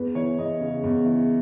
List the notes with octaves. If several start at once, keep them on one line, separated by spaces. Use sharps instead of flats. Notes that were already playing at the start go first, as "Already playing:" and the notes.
Already playing: E2 B4
E3 C#5
E2 D#5
C#3
E2
E3